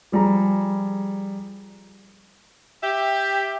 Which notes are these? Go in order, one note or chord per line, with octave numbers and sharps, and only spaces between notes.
F3 G3 G#4 A#5
G4 E5